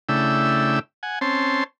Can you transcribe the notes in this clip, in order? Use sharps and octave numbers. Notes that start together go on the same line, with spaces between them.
C#3 A3 D4 E4 G5 E6
F#5 G#5
C4 C#4 A5 C6